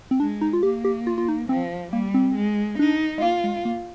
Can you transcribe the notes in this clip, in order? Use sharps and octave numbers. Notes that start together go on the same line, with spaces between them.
C4
G#3 D4
D#4
F4
A#3 G4
G4
F4
F4
D#4
F3 C4
G3 A#3
C4
G#3
D4 D#4
G#3
A#3 F4
G#3
A#3